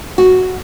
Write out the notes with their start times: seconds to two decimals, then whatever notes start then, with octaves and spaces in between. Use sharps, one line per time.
0.18 F#4